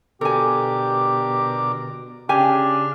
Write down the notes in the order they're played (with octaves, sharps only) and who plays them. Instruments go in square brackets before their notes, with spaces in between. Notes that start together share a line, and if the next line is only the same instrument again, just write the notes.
[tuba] B2 [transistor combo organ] D3 A#4 D6 [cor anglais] G4 [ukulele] A4 G#5
[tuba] C#3 [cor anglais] D4 [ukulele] G4 G#5 [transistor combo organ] F5